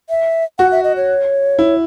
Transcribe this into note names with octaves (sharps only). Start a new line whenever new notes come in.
E5
F#4 F#5
E5
D#5
C#5
E4